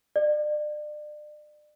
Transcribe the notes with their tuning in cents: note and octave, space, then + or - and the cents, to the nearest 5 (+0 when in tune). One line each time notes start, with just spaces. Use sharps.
D5 +35